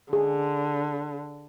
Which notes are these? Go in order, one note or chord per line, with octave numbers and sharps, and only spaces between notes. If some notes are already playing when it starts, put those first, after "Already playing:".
D3 G#4